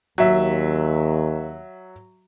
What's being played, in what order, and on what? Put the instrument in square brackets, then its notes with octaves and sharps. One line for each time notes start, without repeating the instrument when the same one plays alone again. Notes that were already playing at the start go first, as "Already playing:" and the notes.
[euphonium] D#2 [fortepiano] F#3 E5